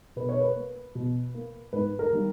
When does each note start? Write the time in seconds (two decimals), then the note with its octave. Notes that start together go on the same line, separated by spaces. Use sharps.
0.16 B2 B4
0.29 C#5
0.40 B4
0.56 A#3
0.95 B2
1.34 A#3
1.73 G#2 B4
1.99 A#4
2.12 D#3 G3 A#3